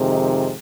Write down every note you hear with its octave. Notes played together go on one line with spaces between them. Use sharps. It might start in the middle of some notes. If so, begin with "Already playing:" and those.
Already playing: F2 C3 D#3 G#3
D#4